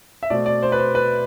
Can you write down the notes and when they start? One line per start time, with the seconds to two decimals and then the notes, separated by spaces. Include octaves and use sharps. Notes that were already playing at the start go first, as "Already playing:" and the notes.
0.23 E5
0.30 B2 A3 C4 D5
0.46 D5
0.63 C5
0.72 B4
0.78 C5
0.95 B4